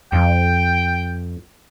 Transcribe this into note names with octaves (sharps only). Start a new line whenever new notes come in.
F2 G5